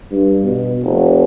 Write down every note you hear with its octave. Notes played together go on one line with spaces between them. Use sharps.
G2
B2
F1